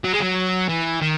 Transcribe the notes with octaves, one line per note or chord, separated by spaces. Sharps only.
F#3
G#3
F#3
E3
D#3